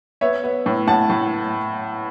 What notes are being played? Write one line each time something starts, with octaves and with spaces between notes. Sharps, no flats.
B3 C#5 E5
B3
A2
A2 F#5 A5
A2